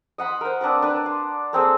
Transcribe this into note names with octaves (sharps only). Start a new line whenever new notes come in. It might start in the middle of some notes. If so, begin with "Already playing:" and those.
D#5 F#5 B5 C6
A#4 C5
C4 D4 B4 A#5
D4 B4
C6
A#3 C4 G#4 A4